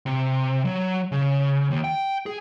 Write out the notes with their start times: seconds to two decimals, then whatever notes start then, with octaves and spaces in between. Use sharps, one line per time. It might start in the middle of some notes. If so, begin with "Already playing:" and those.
0.06 C3
0.65 F#3
1.12 C#3
1.71 D#2
1.84 G5
2.26 G#4